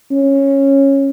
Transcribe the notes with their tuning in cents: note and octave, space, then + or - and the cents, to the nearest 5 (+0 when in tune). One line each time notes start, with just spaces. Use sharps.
C#4 -10